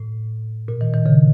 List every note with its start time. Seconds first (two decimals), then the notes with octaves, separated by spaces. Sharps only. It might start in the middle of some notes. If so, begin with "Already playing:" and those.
Already playing: A2
0.68 A#2
0.81 D#3
0.94 D#3
1.06 C#3